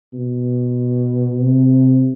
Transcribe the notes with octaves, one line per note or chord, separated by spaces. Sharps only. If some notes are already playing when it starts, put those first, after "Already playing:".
B2
C3